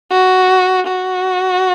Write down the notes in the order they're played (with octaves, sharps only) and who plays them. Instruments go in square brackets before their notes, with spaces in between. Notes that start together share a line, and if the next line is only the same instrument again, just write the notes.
[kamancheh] F#4
F#4